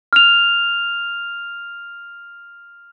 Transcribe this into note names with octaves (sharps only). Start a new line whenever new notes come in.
F6 F7